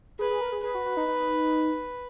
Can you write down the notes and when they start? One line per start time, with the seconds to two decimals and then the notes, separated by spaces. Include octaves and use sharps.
0.19 G#4 B4
0.30 G#4
0.41 A#4
0.52 G#4
0.63 G#4 B4
0.75 F#4
0.86 F#4
0.97 D#4
1.08 D#4